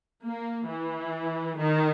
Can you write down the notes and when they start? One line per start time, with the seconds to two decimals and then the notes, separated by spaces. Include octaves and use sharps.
0.24 A#3
0.69 E3
1.59 D#3